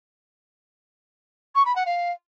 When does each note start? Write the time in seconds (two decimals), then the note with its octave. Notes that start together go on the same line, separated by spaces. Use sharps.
1.55 C#6
1.66 B5
1.76 F#5
1.86 F5